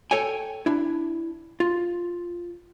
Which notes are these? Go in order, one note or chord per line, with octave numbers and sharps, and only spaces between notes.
A4 C#5 G5 G#5
D4 E4
F4